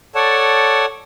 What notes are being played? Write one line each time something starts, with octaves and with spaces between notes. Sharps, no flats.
A4 C#5 D5 F#5 A5